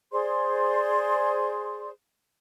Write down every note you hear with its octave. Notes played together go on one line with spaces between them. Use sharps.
G#4 C5 D5 C6